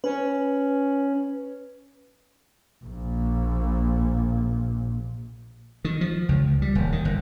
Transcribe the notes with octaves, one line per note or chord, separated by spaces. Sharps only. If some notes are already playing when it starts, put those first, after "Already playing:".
C#4 B4
A#1 A#2
D#3
F3
C#2
G3
D#1
D#3
G1